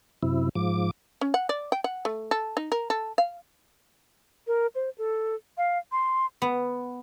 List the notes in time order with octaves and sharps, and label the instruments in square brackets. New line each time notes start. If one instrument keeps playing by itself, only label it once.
[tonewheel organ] F#2 C3 E4
G#2 F3 D6
[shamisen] C#4
F#5
D5
G5
F#5
A3
A4
D#4
A#4
A4
F5
[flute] A#4
C5
A4
F5
C6
[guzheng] B3